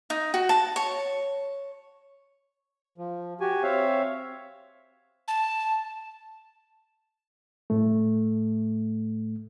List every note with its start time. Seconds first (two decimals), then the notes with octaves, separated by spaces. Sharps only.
0.10 D#4
0.34 F#4
0.49 A5
0.76 C#5
2.98 F3
3.41 F#4 G4 G#5
3.63 C4 C#5 E5 F5
5.28 A5
7.70 A2 A3